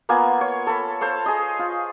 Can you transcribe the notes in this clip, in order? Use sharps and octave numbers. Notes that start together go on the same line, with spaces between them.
A#3 B3 F4 G#5
C#5
A4 B5
A4 C5 C#5 F5
G#4 D#5
F4